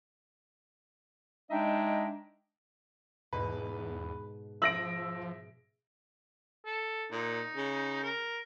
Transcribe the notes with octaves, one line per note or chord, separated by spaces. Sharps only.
G#3 D4 D#4 D#5 E5 G5
E2 G#2 B2 B4
F3 E5 D#6 E6 A#6 D7 F#7
A4
A#2 D#4
C#3
A#4